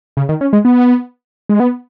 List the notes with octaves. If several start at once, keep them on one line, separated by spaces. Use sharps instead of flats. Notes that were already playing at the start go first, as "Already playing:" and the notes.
C#3
D#3
C#4
G#3
B3
G#3
B3